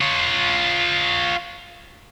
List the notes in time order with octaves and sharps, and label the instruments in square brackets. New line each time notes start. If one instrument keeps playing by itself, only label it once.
[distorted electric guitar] F4 C#5